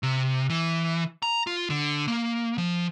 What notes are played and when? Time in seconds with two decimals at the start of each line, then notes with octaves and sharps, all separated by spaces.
0.03 C3
0.50 E3
1.22 A#5
1.47 F4
1.70 D3
2.08 A#3
2.58 F3